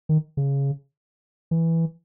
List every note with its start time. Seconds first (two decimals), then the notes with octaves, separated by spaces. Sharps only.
0.09 D#3
0.37 C#3
1.51 E3